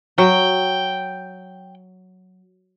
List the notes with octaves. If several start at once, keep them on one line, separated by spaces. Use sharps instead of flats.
F#3 G5